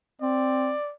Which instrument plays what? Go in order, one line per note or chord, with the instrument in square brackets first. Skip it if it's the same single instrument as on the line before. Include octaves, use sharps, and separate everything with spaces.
[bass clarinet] C4 [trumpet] D5